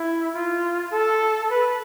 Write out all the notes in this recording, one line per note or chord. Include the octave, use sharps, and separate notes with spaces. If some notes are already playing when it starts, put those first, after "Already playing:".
Already playing: E4
F4
A4
B4